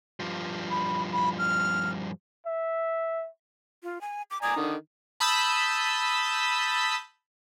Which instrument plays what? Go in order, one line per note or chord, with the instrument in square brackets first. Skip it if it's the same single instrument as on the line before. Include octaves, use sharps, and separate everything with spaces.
[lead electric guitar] G2 F3
[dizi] B5
B5
F6
[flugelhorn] E5
[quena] F4
G#5
D6
[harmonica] D5 G#5 A#5 [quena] D#6
[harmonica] D3 D#3
[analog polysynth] A5 B5 D#6 E6 G6 B6